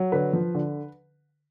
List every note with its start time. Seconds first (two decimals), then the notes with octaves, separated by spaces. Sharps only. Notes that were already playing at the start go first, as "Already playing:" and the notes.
Already playing: F#3
0.12 D3 B4
0.33 F3
0.55 D3